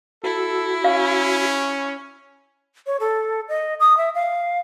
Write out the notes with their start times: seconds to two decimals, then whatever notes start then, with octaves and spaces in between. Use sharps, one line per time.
0.23 E4 F#4 A4
0.84 C#4 F5
2.87 C#5
3.00 A4
3.49 D#5
3.80 D#6
3.97 E5
4.15 F5